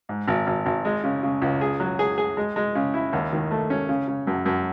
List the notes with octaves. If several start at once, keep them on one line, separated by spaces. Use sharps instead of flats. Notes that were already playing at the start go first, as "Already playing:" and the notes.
G#2
G#1
G#1
G#1
G#3
C#3
C#3
C#2
G#4
F#3
G#4
G#4
G#3
G#3
C#3
E4
D#2
D#3
A3
C#4
C#3
C#3
F#2
F#2